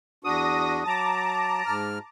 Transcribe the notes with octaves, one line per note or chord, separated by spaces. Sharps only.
E2 D4 F#4 D#6 A#6
F#3 A5 A#5 D6
G#2 F6